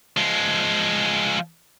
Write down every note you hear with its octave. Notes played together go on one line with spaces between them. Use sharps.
F3 G#3